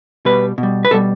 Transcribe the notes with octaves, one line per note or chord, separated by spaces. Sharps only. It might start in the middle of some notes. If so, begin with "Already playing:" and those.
B2 G3 B4
B2
G3
B4
B2 G3 A4